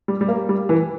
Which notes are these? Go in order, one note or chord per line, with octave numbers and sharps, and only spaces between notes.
G3
G3
A#3
G3
E3